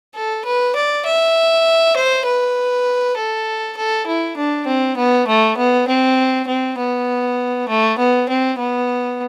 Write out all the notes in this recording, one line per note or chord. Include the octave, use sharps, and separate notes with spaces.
A4
B4
D5
E5
C5
B4
A4
A4
E4
D4
C4
B3
A3
B3
C4
C4
B3
A3
B3
C4
B3